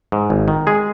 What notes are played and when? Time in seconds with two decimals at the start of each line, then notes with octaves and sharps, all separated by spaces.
0.12 G#2
0.30 G#1
0.48 D#3
0.67 G#3 G#4